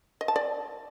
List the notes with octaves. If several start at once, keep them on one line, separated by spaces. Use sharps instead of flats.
D#5
A5
D5